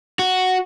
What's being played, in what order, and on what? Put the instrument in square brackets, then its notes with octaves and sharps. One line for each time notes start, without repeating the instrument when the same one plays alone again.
[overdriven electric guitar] F#4